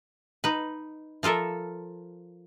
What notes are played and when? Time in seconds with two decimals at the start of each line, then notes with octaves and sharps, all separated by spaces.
0.44 D#4 B4
1.23 F3 F4 A4 A#4 E5